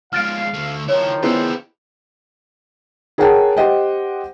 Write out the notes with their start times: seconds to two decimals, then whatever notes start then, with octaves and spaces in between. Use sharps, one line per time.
0.13 F3 G#3 F5 F6 A6 D7
0.54 D2 A3
0.88 D#3 F3 E4 A#4 C#5
1.23 B3 E4 F4 G#4 C5
3.18 G#4 A#4 C#5 F#5 G5 A5
3.57 G4 C5 D#5 F#5 G5